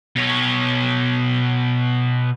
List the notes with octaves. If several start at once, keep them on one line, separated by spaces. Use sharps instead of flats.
B2 C#5